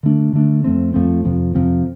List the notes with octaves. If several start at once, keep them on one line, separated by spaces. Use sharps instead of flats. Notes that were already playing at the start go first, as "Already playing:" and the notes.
D3 A3 D4
D3 A3 D4
F2 F3 A3 C4
F2 F3 A3 C4
F2 C3 F3 C4
F2 C3 F3 C4